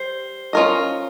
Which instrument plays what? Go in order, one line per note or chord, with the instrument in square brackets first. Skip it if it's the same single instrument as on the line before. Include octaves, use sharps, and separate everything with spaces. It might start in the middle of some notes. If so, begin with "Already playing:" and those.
Already playing: [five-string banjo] G3 [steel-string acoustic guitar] C5
[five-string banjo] C#4 F4 A#4 D#5